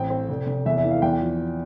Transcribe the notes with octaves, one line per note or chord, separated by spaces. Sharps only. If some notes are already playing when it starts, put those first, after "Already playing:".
Already playing: A1 C4 G5
C4
F1
F1
E2 E5
E5
E3
F5
E2 G5
F3